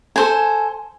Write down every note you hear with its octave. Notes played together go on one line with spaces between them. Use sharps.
A4 C5 G#5